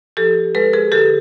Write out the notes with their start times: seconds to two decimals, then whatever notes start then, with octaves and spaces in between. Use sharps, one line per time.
0.17 F3 G4 A4
0.55 G#3 A4 B4
0.73 G#4 A#4
0.92 D3 G4 A4